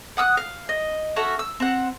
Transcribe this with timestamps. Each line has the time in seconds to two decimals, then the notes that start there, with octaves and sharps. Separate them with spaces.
0.17 F#5 D#6 E6 F#6
0.37 F5
0.69 D#5
1.16 C#4 F#4 A4 E5
1.39 E6
1.60 C4 F#5